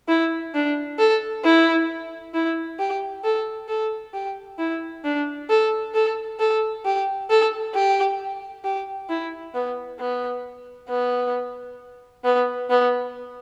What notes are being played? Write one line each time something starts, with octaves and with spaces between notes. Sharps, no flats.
E4
D4
A4
E4
E4
G4
A4
A4
G4
E4
D4
A4
A4
A4
G4
A4
G4
G4
E4
B3
B3
B3
B3
B3